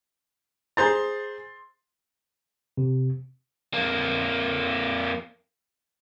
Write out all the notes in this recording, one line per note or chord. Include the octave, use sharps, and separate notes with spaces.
G#4 C5 A#5 C6 A6
C3
F2 A#3